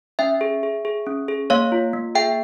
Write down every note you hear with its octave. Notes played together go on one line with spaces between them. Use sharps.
C#4 E5 G5
G#4
G#4
G#4
C#4
G#4
A#3 C#5 F5
F4
A#3
G#4 E5 G5